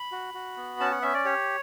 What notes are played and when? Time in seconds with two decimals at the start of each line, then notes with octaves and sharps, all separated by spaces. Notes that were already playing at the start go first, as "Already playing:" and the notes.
Already playing: B5
0.12 F#4
0.34 F#4
0.57 B3
0.80 C#4 A5
0.91 F#5
1.02 C#4 E5
1.14 D5
1.25 G4 C#5